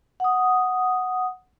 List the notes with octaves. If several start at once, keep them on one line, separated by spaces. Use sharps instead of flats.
F#5 D#6